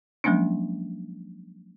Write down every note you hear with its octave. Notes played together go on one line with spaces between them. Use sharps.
F3 F#3 G#3 A#3 C#4 D4